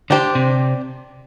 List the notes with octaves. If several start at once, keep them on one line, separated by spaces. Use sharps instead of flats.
D3 D4 G4 C5
C3